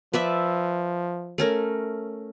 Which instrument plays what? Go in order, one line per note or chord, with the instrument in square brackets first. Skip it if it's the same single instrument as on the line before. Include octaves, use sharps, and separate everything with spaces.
[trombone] F3 [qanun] B4 D5 E5
[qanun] A3 C#4 A#4